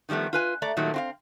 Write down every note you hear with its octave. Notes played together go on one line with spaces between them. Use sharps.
D#3 F3 G3 A3 B3
F4 B4 G#5
A3 D5 A#5
A#2 D#3 F#3 G3 A3
C4 F4 F5